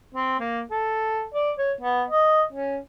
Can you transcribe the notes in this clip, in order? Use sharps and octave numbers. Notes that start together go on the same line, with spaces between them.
C4
A#3
A4
D5
C#5
B3
D#5
C#4